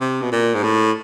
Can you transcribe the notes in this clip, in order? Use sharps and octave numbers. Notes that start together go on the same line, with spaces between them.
C3
B2
A#2
G#2
A2